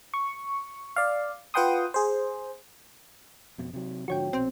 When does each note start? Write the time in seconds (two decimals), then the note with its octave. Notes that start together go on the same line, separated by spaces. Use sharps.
0.14 C#6
0.96 D5 F5
1.54 F4 B4 F#5 G5 C6 D#6
1.94 G#4 C5
3.58 F2 B2
3.73 C3 F#3
4.08 G#2 D3 F3 F#4 C#5 G5
4.33 A#1 B2 C4